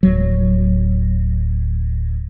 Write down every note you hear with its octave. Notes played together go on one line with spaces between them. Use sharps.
D1 F#3